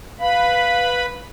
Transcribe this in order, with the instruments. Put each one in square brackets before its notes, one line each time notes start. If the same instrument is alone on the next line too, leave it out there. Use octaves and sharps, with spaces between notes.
[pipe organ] B4 B5 [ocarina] F5